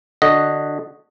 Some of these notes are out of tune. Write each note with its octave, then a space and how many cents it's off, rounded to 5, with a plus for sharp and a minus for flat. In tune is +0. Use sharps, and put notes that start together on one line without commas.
D3 +10 F#4 +0 D#5 +0